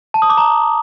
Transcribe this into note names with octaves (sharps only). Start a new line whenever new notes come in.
A5
D#6
D6
A#5